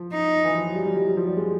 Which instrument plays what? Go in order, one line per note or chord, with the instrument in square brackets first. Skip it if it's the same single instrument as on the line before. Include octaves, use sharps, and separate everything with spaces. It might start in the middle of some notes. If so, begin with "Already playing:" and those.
Already playing: [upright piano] F3
[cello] D#4
[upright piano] E3
F3
F#3
G3
G3
G3
F#3
F3
G3
G#3